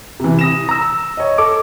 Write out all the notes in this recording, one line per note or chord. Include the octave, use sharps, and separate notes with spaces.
C3 E3
D#6 A#6 E7
A#5 E6
C#5 D#5
A4 D6